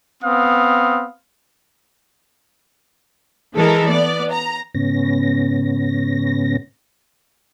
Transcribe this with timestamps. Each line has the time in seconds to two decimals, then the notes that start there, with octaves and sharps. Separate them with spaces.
0.23 B3 C4 F5 D#6
3.55 E3 G#3 A4 A#4
3.89 B3 D5
4.32 A#5
4.74 G#2 C#3 B3 C#4 A#6